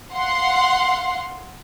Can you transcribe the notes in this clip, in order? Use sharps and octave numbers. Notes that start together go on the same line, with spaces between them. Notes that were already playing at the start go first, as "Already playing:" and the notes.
F5 F#5 C6